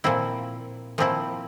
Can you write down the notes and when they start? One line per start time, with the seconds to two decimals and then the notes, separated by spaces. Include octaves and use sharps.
0.04 A#2 F3 C4 E4
0.98 A#2 F3 C4 E4